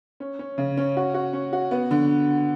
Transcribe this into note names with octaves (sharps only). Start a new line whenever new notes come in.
C#4
C#4
C#3
C#4
F#4
F#4
C#4
F#4
B3
D3